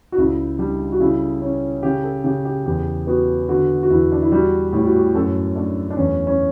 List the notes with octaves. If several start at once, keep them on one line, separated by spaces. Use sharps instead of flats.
F#4
C#2 E4
G3 D4
F#4
C#3 E4
C#4
C#3 G4
A4
C#3 G4
G4
E2 G4
B3 F#4
D3 F#4
F#4
E2 E4
D4
E4
G3 F#4
A2 G4
F#4
G4
F#2 A4
A3 D4
D4
E2 C#4
C#4